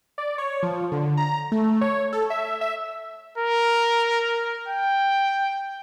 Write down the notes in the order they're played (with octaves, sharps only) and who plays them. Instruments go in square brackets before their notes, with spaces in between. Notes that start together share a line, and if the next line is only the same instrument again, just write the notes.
[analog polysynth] D5
C#5
F3
D3
A#5
A3
C#5
A4
E5
E5
[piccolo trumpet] A#4
G5